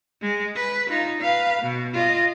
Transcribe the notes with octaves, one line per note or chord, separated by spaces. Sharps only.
G#3
B4
D#4 F4
B4 F5
B2
F4 D#5